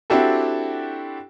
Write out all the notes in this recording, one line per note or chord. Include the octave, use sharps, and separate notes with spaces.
C4 D4 E4 F#4 G4 A4